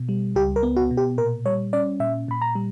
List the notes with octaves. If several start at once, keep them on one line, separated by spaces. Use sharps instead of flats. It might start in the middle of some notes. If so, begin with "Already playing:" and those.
Already playing: B2
G3
C#2 G4
A#4
B3
F#4
B2
G4
A#2 A#4
G3 C#5
C#4 D5
A#2 E5
A#2 B5
A#5
G3